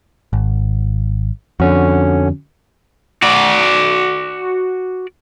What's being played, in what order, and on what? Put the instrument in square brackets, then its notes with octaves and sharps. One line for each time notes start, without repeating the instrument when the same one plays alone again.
[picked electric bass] G#1
[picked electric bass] F2 [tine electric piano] D3 C#4 F#4
[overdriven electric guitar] F#4 D5